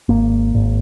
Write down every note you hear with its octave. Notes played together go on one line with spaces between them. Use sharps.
G#1 A#3
G#1